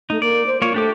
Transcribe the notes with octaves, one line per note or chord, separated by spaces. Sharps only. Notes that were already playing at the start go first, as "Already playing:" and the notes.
A3 D#4
A#3 D5
C5
A#3 F4 C#5
A3 D4 G4 D6